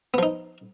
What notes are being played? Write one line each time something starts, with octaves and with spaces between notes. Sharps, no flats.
F3 B3 D#4